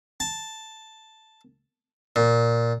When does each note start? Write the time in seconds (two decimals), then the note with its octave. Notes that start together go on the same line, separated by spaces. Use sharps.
0.20 A5
2.16 A#2